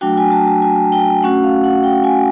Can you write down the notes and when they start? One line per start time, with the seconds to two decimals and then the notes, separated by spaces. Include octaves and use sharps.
0.01 F#3 A3 D4 F#4 G5
0.17 G#5
0.32 A5
0.47 A5
0.62 G#5
0.92 G5
1.23 A3 C#4 F#4 F#5
1.43 F5
1.64 F#5
1.84 G5
2.04 G#5